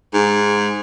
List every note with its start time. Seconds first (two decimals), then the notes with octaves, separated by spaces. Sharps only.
0.14 G#2